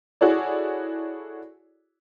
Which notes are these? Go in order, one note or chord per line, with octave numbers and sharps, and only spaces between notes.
E4 F#4 G#4 A4 C#5 D5